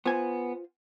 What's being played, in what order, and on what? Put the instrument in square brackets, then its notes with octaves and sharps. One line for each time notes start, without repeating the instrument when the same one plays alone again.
[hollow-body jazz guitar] B3 G#5 [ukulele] F4 C5